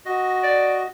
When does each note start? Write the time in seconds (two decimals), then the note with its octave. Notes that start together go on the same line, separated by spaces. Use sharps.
0.05 F#4 D#5
0.43 D5